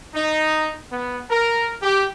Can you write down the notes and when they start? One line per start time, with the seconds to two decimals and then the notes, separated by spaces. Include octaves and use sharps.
0.14 D#4
0.91 B3
1.30 A#4
1.82 G4